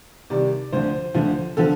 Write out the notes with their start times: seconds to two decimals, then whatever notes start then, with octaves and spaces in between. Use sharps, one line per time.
0.30 C2 C3 D#3 D5
0.72 D2 D3 F3 C5
1.15 D2 D3 F3
1.57 D3 F3 A4